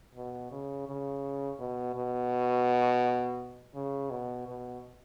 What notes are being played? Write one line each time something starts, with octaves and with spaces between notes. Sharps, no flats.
B2
C#3
C#3
B2
B2
C#3
B2
B2